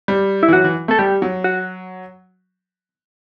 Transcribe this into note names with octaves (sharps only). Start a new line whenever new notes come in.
G3
E4
E3
F#3 F#4
E3
A3 A4
G3 G4
F#3
F#4